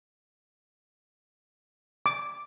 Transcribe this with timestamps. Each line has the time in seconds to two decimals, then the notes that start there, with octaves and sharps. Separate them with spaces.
2.06 D6